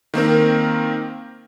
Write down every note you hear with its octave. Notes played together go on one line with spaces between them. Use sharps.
D#3 A#3 C4 A#4